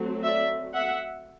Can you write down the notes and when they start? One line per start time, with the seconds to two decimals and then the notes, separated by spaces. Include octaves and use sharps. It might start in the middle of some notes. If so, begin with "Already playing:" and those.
Already playing: F#3 A3 C4
0.23 D5 E5
0.75 E5 F#5